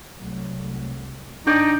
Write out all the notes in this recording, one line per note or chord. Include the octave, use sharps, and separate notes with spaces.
C2 F#3 A3
G#1 D4 D#4 D5 G5 D6